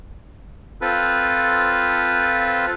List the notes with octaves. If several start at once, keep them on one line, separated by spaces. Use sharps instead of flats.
C4 F4 A4 B4